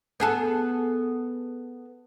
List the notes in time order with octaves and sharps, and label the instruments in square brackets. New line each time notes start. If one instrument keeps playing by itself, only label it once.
[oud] B3 G#4 A4